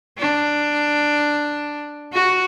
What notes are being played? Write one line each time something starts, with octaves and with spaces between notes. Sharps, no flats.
D4
F#4